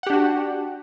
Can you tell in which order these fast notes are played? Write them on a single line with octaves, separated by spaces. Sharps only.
F#5 G4 D4 F#4